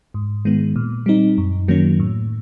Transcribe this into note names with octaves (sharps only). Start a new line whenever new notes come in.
G#2
D#3 G#3 B3
A#2
G3 C4 D#4
F#2
D#3 F#3 A#3 C#4
A2